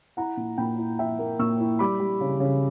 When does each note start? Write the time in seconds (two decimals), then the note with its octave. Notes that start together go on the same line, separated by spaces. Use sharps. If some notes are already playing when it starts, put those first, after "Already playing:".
0.17 E4 F#5 A#5
0.37 A#2
0.58 A#2 G5 B5
0.78 E4
0.99 E4 E5 G5
1.19 A#3
1.39 A#2 C#6 E6
1.60 E4
1.79 G3 B5 D6
2.00 G3
2.20 C#3
2.40 C#3